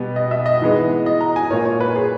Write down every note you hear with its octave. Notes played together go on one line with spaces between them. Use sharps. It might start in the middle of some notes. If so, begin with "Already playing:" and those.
Already playing: B2 G3 B3
D#5
E5
D#5
G#2 E3 G#3 B3
D#5
A#5
G#5
A#2 A#3 C#5
C#5
B4
G#4